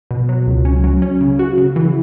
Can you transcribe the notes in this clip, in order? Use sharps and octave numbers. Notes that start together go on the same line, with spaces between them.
B2
F#3
C#2
C#4
F#3
C#4
C#3
F#4
C#3
E3